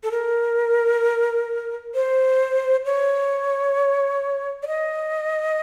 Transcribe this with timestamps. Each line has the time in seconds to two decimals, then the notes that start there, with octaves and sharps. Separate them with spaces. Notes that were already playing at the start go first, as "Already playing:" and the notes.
0.03 A4
0.11 A#4
1.94 C5
2.85 C#5
4.63 D5
4.67 D#5